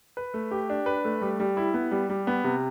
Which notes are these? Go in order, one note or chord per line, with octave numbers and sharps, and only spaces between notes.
B4
A3
G4
D4
B4
A3
G3
G3
E4
B3
G3
G3
B3
C3